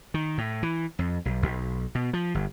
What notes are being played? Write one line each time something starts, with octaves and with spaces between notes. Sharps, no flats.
D#3
A2
E3
F2
B1
B1
B2
F3
G1